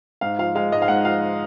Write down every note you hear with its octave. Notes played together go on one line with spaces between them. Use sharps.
G#2 F5
F3 F5
G#3 F5
G#2 D#5
F5
G#2 F#5
F3 F5